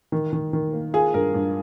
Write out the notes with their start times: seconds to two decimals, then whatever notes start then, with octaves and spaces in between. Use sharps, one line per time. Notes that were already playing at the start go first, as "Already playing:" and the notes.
0.12 D#3
0.33 D#3
0.53 D#3
0.73 A#3
0.94 F4 G#4
1.14 G2 A#4
1.34 G2